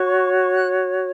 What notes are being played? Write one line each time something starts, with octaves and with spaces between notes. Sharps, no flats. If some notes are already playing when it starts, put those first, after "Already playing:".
Already playing: F#4 C#5 C#6
C#6
F#6